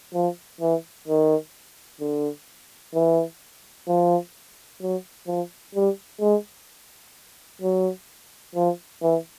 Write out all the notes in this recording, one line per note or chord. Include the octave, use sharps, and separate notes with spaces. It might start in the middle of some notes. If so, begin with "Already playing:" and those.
F3
E3
D#3
D3
E3
F3
F#3
F3
G3
G#3
F#3
F3
E3